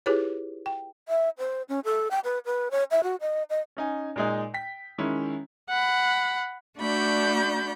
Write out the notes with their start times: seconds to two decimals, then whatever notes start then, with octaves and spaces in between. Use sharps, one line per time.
0.06 E4 F4 G4 G#4 B4 C#5
0.66 G5
1.09 E5
1.38 C5
1.69 C#4
1.85 A4
2.11 G5
2.24 B4
2.46 B4
2.71 C#5
2.91 E5
3.03 F#4
3.21 D#5
3.50 D#5
3.77 C#4 D#4 G#5
4.16 A#2 G#3 D#4
4.54 G5 B6
4.98 D#3 G#3 C#4 E4
5.69 F#5 B5
6.78 A3 D4 F#4 D5 B5 G6